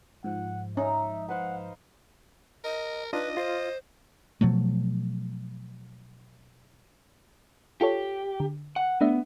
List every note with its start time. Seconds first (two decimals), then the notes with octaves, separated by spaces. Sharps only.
0.24 G#2 F3 F#5
0.77 C#4 D#4 E5 A#5
1.29 B4 C5 F5 F#5
2.64 A#4 D#5
3.13 D4 D#4 F4 B4 D#5
3.37 F4 C5
4.41 B2 F3 F#3 A3
7.81 F4 G4 A4 C#5
8.40 D3
8.76 F#5
9.01 A3 B3 D4 E5